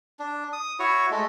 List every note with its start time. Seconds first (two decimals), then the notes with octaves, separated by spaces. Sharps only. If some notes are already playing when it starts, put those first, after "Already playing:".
0.19 D4
0.53 D#6
0.79 E4 F#4 C#5
1.11 G#3 A3